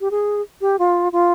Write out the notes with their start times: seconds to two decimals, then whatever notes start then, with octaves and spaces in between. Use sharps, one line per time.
0.01 G4
0.11 G#4
0.61 G4
0.79 F4
1.12 F4